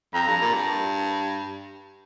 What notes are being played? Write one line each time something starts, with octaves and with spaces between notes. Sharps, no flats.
F2 A#5
G2
A#2
G2